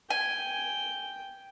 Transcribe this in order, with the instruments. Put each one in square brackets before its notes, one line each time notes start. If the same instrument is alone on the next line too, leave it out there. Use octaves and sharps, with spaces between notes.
[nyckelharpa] G5 [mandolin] G#5